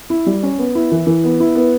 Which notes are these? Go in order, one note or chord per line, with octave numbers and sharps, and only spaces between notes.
E4
G3
C#4
B3
E4
E3
E3
B3
E4
B3